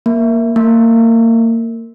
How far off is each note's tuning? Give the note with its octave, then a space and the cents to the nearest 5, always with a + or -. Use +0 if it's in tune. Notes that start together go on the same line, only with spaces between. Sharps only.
A#3 +0
A#3 -30